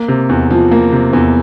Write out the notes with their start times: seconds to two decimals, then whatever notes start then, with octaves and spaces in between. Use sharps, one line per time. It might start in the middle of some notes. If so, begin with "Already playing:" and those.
Already playing: A#3
0.08 C3
0.29 E2
0.50 F3
0.71 A#3
0.92 C3
1.13 E2